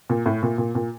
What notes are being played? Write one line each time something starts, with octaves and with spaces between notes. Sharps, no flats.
A#2
A2
A#2
A#2
A#2